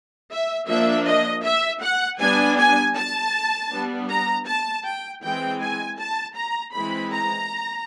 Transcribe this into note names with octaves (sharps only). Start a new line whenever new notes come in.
E5
F3 A#3 D4 E5
D#5
E5
F#5
G3 B3 D4 G#5
G#5
A5
G3 B3 D4
A#5
A5
G5
E3 G#3 C4 G5
G#5
A5
A#5
E3 G#3 C4 B5
A#5